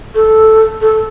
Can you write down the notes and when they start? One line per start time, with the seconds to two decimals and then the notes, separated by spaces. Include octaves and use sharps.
0.15 A4
0.81 A4